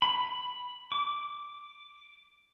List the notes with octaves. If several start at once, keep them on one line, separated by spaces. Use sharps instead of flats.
B5
D6